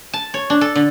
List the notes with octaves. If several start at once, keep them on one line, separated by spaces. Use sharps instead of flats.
A5
C#5
D4
A4
D3